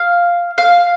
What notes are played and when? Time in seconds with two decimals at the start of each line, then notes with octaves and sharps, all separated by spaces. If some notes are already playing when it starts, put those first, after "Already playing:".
Already playing: F5
0.58 F5